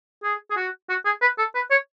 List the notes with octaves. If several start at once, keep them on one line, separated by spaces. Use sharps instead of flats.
G#4
G#4
F#4
F#4
G#4
B4
A4
B4
C#5